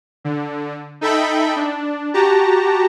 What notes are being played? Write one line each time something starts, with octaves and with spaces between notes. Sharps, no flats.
D3
D#4 A4 E5 G5 B5
D4
F#4 G4 A5 A#5